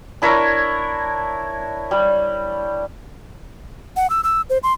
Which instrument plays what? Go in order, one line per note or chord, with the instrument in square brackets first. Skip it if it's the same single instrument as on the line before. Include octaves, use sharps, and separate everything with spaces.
[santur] D4 E4 A#4 C#5
G3
[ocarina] F#5
E6
E6
C5
C6